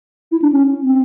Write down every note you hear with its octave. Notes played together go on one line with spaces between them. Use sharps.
E4
D4
C#4
C4